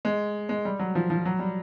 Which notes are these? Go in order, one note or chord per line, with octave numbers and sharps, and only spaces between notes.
G#3
G#3
G3
F#3
F3
F3
F#3
G3